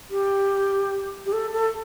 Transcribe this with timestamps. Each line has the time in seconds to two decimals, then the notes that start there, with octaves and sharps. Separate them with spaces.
0.10 G4
1.26 G4
1.33 A4
1.53 A4